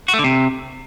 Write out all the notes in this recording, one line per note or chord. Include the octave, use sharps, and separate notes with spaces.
F#4
A3
D3
C3